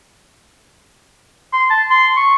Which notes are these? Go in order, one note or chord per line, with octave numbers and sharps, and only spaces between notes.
C6
A5
C6
C#6